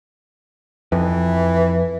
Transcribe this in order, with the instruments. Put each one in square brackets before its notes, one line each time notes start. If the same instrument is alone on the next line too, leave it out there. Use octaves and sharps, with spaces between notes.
[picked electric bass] F2 [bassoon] E3